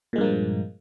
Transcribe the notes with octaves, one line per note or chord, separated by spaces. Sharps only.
G2 A#2 F3 G#3 A#3